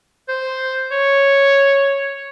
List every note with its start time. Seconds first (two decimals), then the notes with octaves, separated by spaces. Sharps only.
0.29 C5
0.91 C#5